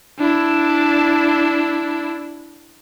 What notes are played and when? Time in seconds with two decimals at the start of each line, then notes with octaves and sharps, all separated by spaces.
0.19 D4 E4